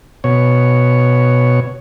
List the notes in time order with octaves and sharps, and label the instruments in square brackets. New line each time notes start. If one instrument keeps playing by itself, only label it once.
[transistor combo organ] B2 C#5